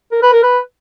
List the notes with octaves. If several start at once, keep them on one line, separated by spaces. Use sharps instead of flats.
A#4
B4
A#4
B4